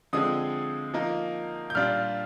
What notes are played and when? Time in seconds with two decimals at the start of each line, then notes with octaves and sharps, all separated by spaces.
0.13 D3 F3 G#3 C4 D#6
0.94 F3 A#3 D#4
1.70 G6
1.75 A#2 G3 D4 F4 F6